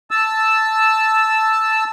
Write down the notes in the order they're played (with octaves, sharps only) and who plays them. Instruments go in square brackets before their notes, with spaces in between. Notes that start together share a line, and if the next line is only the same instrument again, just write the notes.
[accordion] A5 E6